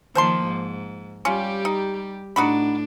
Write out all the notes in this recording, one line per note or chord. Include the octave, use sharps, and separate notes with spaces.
D#3 F3 A#3 C5 A5 C6
G#2
G3 C#4 F4 G4
D#4
A2 D4 D#4 F#4 B5